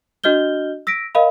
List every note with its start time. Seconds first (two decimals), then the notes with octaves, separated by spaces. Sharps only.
0.24 D4 F#4 D#5 F6 G6 G7
0.87 E6 A#6 B6 D7
1.15 A#4 D#5 F5 B5